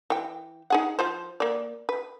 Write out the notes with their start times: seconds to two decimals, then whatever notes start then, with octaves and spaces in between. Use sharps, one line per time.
0.10 E3 G5
0.70 D#4 G#4 F#5
0.99 F3 F4 C5
1.40 A#3 D5
1.89 B4